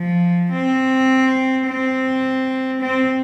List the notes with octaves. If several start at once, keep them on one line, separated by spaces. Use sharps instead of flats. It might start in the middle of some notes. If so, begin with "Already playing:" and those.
Already playing: F3
C4
C4
C4